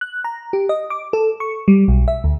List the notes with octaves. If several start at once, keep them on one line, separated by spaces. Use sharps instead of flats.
F#6
A#5
G4
D#5
D6
A4
C#6
G3
B1
E5
D2